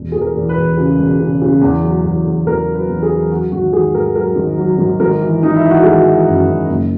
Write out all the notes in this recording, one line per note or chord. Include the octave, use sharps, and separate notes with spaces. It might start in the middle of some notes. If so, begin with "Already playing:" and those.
Already playing: E1
E2 G#4
A#4
E2
B4
E1
C#3
E1
C#3
C#3
E2
F#3
E2
E2
E2 A#4
F#3
B4
E2
G#4
F#3
F#3 F#4
G#1 F#4
D#3 G#4
G#2 A#4
F#3 A#4
G#1
F#3
G#1
G#1 A#4
E3
E3 D#4
E4
E3
F#4
G#1 G#4
E3
F#2
F#2
F#1